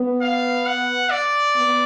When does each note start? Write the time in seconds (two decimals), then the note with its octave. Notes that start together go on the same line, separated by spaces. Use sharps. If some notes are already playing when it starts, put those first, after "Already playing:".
Already playing: B3
0.21 F5
0.66 F#5
1.10 D5
1.55 B3